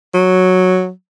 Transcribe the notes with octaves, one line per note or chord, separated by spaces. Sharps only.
F#3